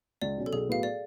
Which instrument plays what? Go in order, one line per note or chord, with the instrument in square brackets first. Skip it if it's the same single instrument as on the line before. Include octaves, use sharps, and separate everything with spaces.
[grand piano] C#2 [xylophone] D5
[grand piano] B2 F#3 C#4
[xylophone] A4
[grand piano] B1 [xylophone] G#4
[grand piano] A2 F#3 B3 F#4 [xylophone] F5
[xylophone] D5